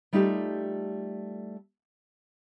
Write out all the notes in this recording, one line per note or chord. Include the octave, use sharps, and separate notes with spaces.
G3 A3 D#4 F4 G4 A4